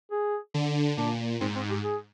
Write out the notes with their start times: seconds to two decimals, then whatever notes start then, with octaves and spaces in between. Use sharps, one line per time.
0.11 G#4
0.54 D3
0.97 A#2 D4
1.40 G#2 C4
1.56 C4
1.69 G4
1.83 G#4